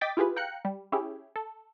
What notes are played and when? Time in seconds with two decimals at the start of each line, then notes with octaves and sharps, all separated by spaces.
0.01 D#5 G5 D6 A6 B6
0.17 E4 F4 G4 G#4 B4
0.36 F5 G5 A#5 F#6 C#7
0.65 G3
0.92 C#4 E4 G4 G#4
1.36 A4